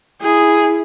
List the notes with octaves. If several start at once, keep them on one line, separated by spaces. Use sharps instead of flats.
E4 G#4